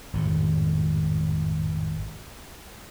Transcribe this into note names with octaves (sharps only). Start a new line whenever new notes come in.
G#1 F2 A2